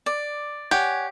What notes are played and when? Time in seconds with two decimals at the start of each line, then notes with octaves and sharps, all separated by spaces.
0.06 D5
0.71 G4 C#5 F#5 G#5